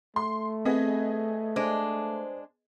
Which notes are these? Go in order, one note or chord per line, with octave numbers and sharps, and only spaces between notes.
A3 C6
B3 C4 G#4 D#5
G#3 D4 C5